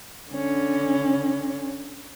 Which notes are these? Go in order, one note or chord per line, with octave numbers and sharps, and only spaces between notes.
D3 C#4